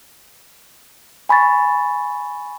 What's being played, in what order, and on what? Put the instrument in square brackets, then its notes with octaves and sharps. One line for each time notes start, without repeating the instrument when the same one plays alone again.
[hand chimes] G#5 B5 C#6 A6